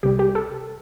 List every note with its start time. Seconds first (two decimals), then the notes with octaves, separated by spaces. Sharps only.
0.03 C2 C3 G3 G4
0.19 G4
0.35 A4